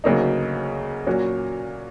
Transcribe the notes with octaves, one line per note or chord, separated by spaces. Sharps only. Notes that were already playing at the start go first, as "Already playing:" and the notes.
D2 C#3 F#3 A#3 D#4
A#2 F#3 A#3 C#4 F#4